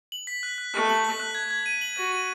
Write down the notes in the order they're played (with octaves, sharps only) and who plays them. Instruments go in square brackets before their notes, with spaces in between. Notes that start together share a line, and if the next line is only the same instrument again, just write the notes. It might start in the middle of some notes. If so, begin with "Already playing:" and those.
[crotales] F#7
B6
F#6
F#6
[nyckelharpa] A3 [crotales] F#6
[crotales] F#7
B6
F#6
G#6
G#6
D#7
F#7
[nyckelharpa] F#4 [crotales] G#6
[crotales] D#7